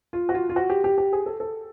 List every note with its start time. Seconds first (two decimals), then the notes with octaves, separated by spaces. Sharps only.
0.13 F4
0.29 F#4
0.34 F4
0.49 F4
0.56 F#4
0.70 G4
0.84 G4
0.98 G4
1.13 G#4
1.26 A4
1.40 A4